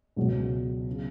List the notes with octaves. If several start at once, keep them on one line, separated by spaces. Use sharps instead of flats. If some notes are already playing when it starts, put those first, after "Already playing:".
C#2 B2 F#3
C#3